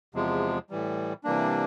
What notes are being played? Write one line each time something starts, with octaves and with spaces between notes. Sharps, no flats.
E2 C3 F3 G#3
A2 E3 G3
C3 E3 G3 A#3 D4